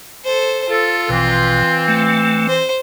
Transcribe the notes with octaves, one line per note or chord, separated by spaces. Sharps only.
A4 C5
F4 A4
A#1 B2 E3 C4
A3
C5